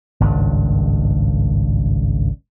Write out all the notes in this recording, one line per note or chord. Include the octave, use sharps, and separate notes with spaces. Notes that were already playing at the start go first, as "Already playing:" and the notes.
G#1 C#2 G2